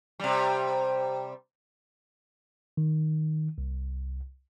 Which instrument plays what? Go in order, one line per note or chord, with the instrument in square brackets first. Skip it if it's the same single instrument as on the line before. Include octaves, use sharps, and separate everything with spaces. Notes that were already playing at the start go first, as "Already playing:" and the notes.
[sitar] C3 G3
[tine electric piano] D#3
C2